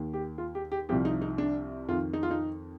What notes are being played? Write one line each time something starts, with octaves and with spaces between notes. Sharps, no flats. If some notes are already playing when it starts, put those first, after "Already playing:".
Already playing: D#2 D#3
G4
F4
G4
G4
C2 C3 F3 G4
D#4
D#4
D4
F2 D#3 F4
D#4
F4
D#4